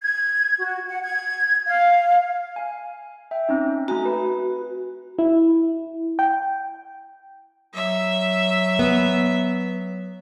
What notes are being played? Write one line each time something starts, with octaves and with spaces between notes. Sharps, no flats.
G#6
F#4
F#5
G#6
F5
F5 G#5
E5 G5
C4 C#4 D#4
A3 F#4 G#5 A#5
B4
E4
G5
F#3 E5
B3